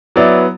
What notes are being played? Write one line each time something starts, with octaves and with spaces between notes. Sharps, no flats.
F#3 B3 E4 D5